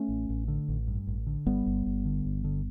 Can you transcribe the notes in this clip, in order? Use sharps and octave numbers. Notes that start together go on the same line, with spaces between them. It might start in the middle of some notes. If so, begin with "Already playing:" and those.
Already playing: A3 C#4
A1
A1
D3
A1
G2
A1
D3
G1 G3 B3
G1
G1
D3
G1
D3